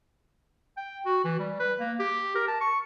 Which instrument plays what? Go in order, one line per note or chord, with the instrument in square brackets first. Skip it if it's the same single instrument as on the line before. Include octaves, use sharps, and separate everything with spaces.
[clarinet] G5
F#4
E3
G3
B4
A#3
G4
A#4
A5
C#6